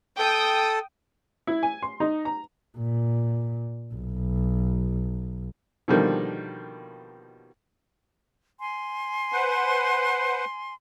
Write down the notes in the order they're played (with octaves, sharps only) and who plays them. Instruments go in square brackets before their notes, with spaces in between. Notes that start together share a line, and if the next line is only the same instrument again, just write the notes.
[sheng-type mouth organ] A4 [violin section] G5 D#6
[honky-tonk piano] E4
G#5
C6
D#4
A#5
[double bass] A#2
B1
[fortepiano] B2 D3 D#3 F3 G3 A#3
[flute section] G#5 C6
[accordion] B4 C5 F#5